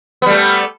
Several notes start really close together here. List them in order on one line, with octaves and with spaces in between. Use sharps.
B3 G3 A3